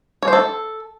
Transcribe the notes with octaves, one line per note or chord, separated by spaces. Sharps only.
C#5
C5
A4